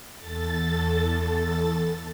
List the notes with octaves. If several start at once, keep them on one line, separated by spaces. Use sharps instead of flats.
E2 A4 A6